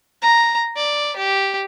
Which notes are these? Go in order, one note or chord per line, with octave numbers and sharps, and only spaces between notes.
A#5
D5
G4